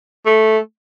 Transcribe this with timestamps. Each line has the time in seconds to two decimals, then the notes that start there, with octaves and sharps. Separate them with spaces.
0.26 A3